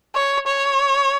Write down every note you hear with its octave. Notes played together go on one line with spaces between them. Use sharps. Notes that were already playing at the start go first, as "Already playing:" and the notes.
C#5
C#5